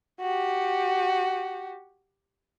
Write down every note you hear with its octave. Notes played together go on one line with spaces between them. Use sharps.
F#4 G4